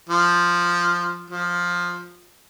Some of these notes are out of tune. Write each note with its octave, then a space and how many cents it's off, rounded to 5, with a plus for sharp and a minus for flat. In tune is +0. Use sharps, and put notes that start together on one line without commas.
F3 +0
F3 +10